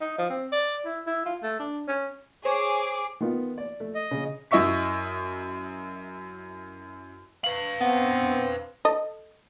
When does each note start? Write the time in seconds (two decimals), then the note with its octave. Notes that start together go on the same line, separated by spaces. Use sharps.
0.01 D#4
0.18 F3
0.30 C4
0.52 D5
0.86 E4
1.07 E4
1.25 F4
1.43 A3
1.59 D4
1.88 C#4
2.45 G#4 C5 C#5 D6
3.20 D#3 B3 F4
3.58 D5
3.80 A3
3.95 D#5
4.11 C#3
4.51 F#2 E4 D#5 E5 C#6 B6
7.44 B4 F5 F#7
7.81 B3 C4 F#5
8.85 A4 D#5